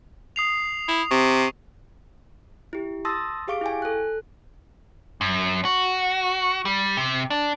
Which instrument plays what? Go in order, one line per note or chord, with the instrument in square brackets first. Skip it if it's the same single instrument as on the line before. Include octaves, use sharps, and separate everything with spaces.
[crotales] D#6 C7 F7
[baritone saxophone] E4
[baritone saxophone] C3 [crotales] C#6
[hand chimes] E4 G4
A5 C6 D#6 E6 A6 A#6
G4 G#4 F5 C#6 D6 D7
E4 G5 G#5
A4 F#6
[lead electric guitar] F#2
F#4
G3
C3
D4